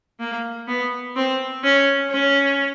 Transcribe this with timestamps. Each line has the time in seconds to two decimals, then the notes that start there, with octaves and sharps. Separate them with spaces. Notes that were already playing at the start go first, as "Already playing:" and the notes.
0.20 A#3
0.68 B3
1.16 C4
1.64 C#4
2.11 C#4